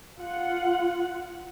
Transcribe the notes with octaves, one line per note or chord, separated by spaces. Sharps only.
F4 F#5